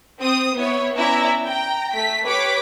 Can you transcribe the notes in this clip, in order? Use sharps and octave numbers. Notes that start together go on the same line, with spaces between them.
C4 D#6
B3 E4 C#5
B3 C#4 E4 D5 E5 A#5
G5 A#5
A3 B6
G4 B4 C#5 D6 B6